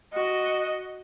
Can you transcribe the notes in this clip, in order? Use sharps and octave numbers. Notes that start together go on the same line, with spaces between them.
F#4 D#5